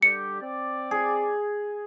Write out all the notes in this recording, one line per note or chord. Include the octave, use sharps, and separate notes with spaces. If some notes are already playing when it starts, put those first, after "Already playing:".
D3 G3 G4 C#7
C4 D5
G#4